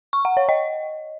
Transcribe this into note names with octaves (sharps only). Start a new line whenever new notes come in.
C#6
F#5
C#5
D#5